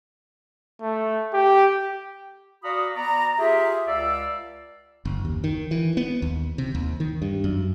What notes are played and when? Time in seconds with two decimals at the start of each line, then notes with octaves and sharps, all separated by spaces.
0.82 A3
1.34 G4
2.63 F#4 D5 F5 A#5 B5 D#6
2.95 B3 D5 A#5
3.39 F4 G4 G#4 E5
3.87 C#2 D5 F5 E6
5.05 F#1
5.25 D#2
5.44 D#3
5.71 E3
5.97 B3
6.22 D#2
6.58 C3
6.75 D#2
7.00 D#3
7.22 G2
7.44 F#2